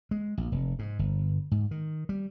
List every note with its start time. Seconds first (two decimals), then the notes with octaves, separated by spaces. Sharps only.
0.11 G#3
0.38 A#1
0.52 F1
0.79 G#2
0.99 G1
1.51 G#2
1.71 D#3
2.09 G3